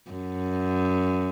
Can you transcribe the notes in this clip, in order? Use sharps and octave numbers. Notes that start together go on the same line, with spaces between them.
F#2